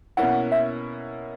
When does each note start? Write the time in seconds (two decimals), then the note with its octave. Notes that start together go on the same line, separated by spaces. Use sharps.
0.17 B2 A#3 C#4 E4 F#5
0.52 E5